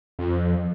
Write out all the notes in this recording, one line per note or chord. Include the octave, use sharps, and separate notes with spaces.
F2